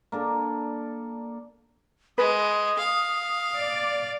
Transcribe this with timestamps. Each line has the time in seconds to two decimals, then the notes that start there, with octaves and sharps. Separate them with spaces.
0.12 A#3 D4 A4
2.18 G#3 B4 D#6
2.78 F5
3.57 D5